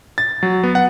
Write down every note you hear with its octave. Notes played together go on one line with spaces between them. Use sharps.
A6
F#3
B3
F#5